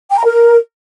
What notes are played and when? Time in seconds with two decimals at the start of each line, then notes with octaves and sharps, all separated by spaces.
0.11 G5
0.18 A#5
0.25 A#4